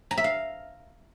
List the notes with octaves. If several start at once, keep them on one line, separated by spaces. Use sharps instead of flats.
A#5
E5
F5